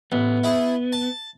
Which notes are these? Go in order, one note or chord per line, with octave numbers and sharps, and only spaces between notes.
A1 B3
E4 G#4
A5